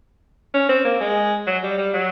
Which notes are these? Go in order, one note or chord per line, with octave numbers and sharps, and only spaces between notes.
C#4
C4
A#3
G#3
F#3
G3
G3
F#3